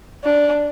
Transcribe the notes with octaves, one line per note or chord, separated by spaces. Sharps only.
D4